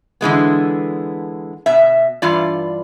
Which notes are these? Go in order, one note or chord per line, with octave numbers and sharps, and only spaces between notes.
D3 E3 G#3 B3
B2 E5
G2 E3 F4 D5